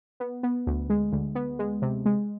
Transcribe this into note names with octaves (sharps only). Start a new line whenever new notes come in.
B3
B3
D2
G#3
D2
B3
G#3
C3
G#3